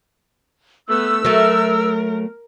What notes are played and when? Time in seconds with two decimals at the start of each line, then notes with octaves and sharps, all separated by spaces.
0.89 A3 B3 E6
1.25 F#3 A3 A#4